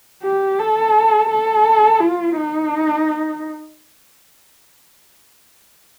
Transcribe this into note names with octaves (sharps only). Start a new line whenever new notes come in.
G4
A4
A4
F4
D#4